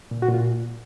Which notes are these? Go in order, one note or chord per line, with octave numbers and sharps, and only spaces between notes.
A#2
F#4
A#2
F4